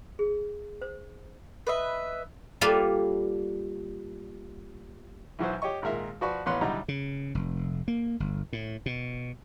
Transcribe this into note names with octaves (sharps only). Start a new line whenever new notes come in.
G#4
C5
B4 D#5 E5
G3 A#3 F4 A4 B4
B1 E3 F#3 C5
G4 C#5 D#5 C#6
G#1 A#2 G#3 A#4 E5
F3 F#4 B4 D5 C#6
A1 B3 C#5 C6 F#6
D2 A2 F#3 G3 D#4 A#5
C#3
F1
A#3
G1
A2
B2